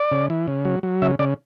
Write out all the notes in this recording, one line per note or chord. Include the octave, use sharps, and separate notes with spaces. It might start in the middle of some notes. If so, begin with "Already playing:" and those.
Already playing: D5
C#3
E3
C#3
F#3
F#3
C#3 E5
C#3 D5